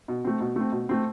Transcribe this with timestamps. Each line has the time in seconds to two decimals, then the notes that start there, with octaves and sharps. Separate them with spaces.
0.08 B2
0.24 A3 C4
0.40 B2
0.56 A3 C4
0.72 B2
0.89 A3 C4